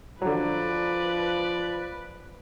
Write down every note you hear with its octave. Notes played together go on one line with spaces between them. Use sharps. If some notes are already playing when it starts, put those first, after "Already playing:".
D3 F3 F#3 B4 D5